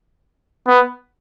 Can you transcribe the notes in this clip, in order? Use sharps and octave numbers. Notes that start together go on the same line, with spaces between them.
B3